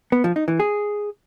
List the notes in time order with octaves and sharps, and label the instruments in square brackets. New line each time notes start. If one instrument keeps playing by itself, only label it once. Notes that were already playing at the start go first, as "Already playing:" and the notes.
[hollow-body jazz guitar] B3
F3
D#4
E3
G#4